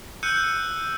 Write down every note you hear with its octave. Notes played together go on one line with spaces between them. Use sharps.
E6 F#6 G6 C#7 D#7